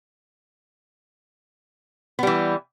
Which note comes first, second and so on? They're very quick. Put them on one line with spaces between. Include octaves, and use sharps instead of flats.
B3 G3 E3